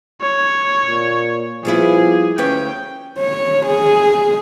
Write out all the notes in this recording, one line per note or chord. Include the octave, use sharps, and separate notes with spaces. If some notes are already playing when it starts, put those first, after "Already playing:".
C#5
A#2
F3 G3 B3 E4 G#4
D2 C#4 B4 G5
C#5
G#4